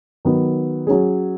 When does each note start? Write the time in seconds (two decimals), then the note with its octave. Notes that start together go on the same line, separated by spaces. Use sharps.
0.25 D#3 F#3 B3
0.87 F#3 C#4 G#4